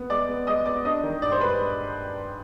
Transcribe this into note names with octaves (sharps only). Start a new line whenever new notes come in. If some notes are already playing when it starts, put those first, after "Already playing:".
Already playing: B3
G#3 D5 D6
B3
G#3 D#5 D#6
B3 D5 D6
D4 D#5 D#6
D#3
G2 D5 D6
C5 C6
G#3 B4 B5